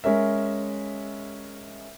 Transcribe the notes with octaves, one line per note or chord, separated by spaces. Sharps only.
G#3 C#4 A#4 E5